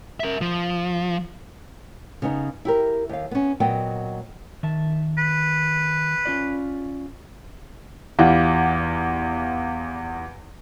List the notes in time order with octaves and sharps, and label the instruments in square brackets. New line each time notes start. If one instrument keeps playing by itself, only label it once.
[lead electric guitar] A#4 E5
F3
[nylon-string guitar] C#3 B3 D#4
E4 G4 A#4
D#2 F5
B3 C#4
A#2 F#3 B3 D#5 G5
[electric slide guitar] D#3 E5 A5
[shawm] B4
[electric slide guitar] C#4 F4 D5
[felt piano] E2 E3 F4 G4 D5 F#5